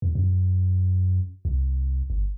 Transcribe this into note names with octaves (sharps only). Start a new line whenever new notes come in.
E2
F#2
C2
G1